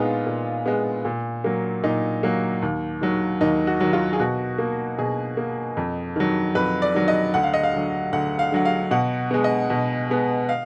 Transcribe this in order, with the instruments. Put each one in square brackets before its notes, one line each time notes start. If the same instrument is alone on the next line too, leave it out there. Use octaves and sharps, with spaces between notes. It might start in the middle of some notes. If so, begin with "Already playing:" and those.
Already playing: [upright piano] A#2 G#3 B3 D#4 F4
A#2
G#3 B3
A#2
F#3 A#3
A#2 D#4
F#3 A#3
D#2
D#3 F#3
D#2 D#4
F#4
D#3 F#3
F4
G#4
B2 F#4
A#3
B2 G#4
A#3
F2
D#3 F#3
F2 B4
D5
D#3 F#3
D#5
D2 F#5
F5
D#5
F5
D3 F#3
D2 F#5
F5
D3 F#3 F#5
F5
B2 F#5
G#3 B3
D#5
B2
G#3 B3
F5